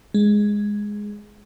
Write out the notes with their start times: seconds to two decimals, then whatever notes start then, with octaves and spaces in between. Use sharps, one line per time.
0.14 G#3